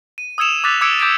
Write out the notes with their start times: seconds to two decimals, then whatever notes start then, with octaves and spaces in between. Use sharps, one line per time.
0.18 D#7
0.38 D#6 E6 G#6 C#7 E7 F7
0.64 D6 D#6 F#6 A6 B6 F7
0.81 D6 E6 G#6 C#7 D7
1.00 D6 G6 A6 B6 D7 E7